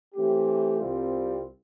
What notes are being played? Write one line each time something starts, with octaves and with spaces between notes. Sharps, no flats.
E3 A3 C4 G4
C2 C3 G3 C4 F4